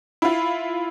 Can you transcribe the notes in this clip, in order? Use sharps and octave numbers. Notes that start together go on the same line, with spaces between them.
E4 F4